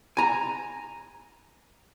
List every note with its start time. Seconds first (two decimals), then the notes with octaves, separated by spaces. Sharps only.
0.17 G#5 A#5